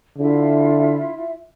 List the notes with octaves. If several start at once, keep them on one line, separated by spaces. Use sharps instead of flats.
D3 E4 F4 E5